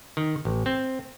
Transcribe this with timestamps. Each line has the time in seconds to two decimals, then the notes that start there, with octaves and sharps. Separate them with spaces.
0.17 D#3
0.45 A1
0.66 C4